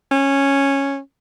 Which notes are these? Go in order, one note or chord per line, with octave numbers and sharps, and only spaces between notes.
C#4